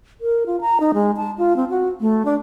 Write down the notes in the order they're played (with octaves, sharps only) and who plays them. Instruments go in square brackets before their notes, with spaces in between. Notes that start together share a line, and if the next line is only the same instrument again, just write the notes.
[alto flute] A#4
F4
A#5
D#4
G#3
A5
F4
C4
F#4
A3
D4